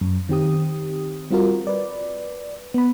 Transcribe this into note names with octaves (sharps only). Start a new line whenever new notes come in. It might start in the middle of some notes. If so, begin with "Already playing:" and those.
F#2
D#3 C4 G4 D#6
G3 C4 F4 F#4 A#4
B4 D5
B3 B5